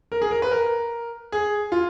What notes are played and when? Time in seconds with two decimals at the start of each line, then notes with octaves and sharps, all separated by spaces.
0.12 A#4
0.22 G#4
0.31 A#4
0.42 B4
0.51 A#4
1.32 G#4
1.72 F4